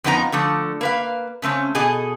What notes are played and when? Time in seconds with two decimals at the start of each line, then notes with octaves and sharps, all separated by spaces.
0.04 F2 F3 B3 D#4 F4 A#5
0.32 D3 F3 A3
0.81 A#3 B4 F5
1.42 C#3 A3 C4 C#4
1.75 B2 G#4 A4 D#5